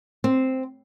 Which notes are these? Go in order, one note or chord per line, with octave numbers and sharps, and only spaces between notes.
C4